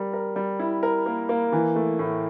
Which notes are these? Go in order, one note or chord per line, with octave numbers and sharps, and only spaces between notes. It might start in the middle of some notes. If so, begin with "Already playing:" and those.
Already playing: G3 A#4
A#4
G3
E4
A#4
A#3
A#3
E3
A3
A2